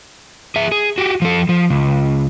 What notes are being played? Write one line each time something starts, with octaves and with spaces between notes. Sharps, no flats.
G#4 E5
G#4
F#4 G4
F3 A4
F3
C#2